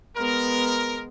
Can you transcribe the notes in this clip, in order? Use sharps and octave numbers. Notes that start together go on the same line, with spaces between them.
G#3 B3 A#4